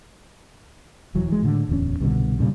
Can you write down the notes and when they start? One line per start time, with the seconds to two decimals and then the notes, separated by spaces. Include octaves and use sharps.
1.15 D#1 E3 F#3
1.28 E3 G#3
1.43 A2 D3
1.69 D1 E2 F#3 C#4
2.00 C2 G2 B2 D3
2.39 G2 A#2 C#3 G3